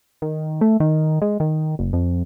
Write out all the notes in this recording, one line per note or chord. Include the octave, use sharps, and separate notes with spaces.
D#3
A3
D#3
G#3
D#3
F#1
F2